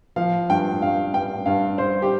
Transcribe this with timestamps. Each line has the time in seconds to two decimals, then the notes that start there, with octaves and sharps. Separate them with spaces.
0.16 F3 F5
0.49 G2 G5
0.82 G2 F5
1.14 G2 G5
1.46 G2 F5
1.78 G2 C5
2.02 G4